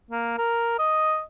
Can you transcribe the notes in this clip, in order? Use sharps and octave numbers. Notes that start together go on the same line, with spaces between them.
A#3
A#4
D#5